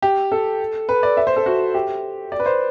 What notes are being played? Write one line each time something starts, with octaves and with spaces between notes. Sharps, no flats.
G4
A4
B4
D5
E5
C5
A4
F#4
G4
D5
B4
C5